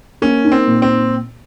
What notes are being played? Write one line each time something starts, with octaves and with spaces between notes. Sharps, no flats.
A#3 C#4
D#4
C4
A#2
C4